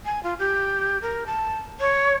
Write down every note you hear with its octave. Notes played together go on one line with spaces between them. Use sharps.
G#5
F4
G4
A#4
A5
C#5